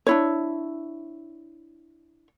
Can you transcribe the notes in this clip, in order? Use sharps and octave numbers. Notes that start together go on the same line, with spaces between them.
D4 E4 C#5